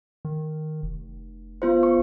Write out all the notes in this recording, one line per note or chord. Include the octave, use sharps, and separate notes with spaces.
D#3
F1
B3 F4 C5
C#6